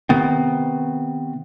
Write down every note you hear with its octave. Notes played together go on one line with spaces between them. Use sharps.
C3 D#3 B3 C4